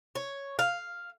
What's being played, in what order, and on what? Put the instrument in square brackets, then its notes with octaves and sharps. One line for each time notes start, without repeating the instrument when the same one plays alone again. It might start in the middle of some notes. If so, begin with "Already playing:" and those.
[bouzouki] C#5
F5